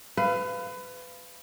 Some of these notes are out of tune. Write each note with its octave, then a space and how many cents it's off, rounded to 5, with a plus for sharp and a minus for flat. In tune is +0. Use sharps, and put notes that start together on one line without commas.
B4 +25 F5 -15